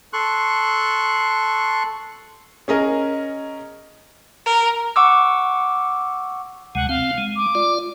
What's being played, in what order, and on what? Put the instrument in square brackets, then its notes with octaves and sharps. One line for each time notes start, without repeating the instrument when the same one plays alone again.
[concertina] A4 C6 C#6 F#6
[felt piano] C#4 G#4 A#4 D#5
[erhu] A#4
[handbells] F#5 C#6 D6 E6
[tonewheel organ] D2 C3 G#3 [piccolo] F#5
[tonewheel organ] C4 [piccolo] F5
[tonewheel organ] G#3
[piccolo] D6
[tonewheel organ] F4 D5